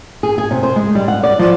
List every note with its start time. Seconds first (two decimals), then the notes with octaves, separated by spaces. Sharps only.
0.23 G#4
0.38 G#4
0.51 C3
0.63 C5
0.76 G#3
0.95 G3
1.08 F#5
1.23 D5
1.39 F3